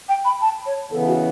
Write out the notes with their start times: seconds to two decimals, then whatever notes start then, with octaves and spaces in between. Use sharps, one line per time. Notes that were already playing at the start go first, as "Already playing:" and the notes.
0.09 G5
0.25 B5
0.42 A5
0.66 C#5
0.90 C#3 E3 B3 A4
1.08 F#4